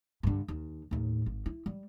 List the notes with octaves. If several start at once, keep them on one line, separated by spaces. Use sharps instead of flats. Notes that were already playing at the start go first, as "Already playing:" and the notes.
G2 D3
D#2
D#2 A2
G#1
E4
G3